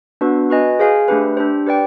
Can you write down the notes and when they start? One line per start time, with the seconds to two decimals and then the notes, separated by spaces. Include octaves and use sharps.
0.21 B3 D4 F#4 B4
0.50 F#4 B4 D#5 G#5
0.79 G#4 C5 F5 G#5
1.08 A3 D4 G4 B4
1.37 D4 G4 C5
1.66 G4 B4 D5 G5